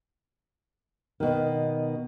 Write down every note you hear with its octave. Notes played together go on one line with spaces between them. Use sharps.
B2 D#3